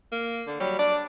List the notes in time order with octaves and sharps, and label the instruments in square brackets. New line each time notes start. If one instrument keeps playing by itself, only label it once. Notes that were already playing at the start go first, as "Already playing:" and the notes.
[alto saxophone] A#3
[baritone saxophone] D3
[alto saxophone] F#3 [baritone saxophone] G3
[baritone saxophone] D4 [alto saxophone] D5